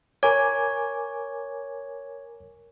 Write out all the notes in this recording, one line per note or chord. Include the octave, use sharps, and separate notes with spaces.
A#4 C#5 G#5 D6